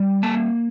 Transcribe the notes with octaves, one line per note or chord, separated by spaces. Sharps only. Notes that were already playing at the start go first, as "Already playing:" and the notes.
Already playing: G3
A#3 A5